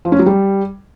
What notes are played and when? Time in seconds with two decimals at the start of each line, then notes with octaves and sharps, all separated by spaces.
0.05 F3
0.12 C#4
0.19 F#3
0.26 G3